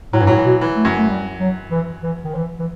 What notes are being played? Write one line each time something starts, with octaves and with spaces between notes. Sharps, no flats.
A2 F#3
G2 E3
A2 F#3
E3
B2
E3
A3
F#2
A3
G3
F#3
E3
E3
D#3
E3
E3